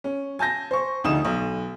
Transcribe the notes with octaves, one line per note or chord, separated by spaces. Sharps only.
C#4
G#5 A5 G6 A#6
C5 C#6
F1 D2 D#4 D#6 E7
B1